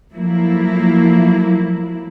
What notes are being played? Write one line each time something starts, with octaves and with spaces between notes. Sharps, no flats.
F3 F#3 A3 A#3 E4